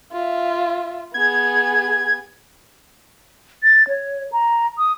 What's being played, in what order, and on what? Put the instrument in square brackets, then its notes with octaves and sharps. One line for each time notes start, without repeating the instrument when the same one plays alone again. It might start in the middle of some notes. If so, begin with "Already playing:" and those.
[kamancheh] F4 E5
[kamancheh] B3 G#4 [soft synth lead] G#6
[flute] A6
C#5
A#5
D#6